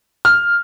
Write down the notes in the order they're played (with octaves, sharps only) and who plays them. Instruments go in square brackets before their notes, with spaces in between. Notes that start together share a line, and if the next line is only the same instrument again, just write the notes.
[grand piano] F6